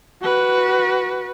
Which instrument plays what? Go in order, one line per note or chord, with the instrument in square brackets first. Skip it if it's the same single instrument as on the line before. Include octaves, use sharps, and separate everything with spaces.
[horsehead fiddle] F#4 B4